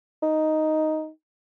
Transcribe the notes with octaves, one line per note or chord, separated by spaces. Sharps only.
D#4